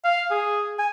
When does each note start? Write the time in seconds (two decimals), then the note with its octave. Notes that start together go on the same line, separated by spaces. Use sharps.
0.04 F5
0.31 G#4
0.79 G#5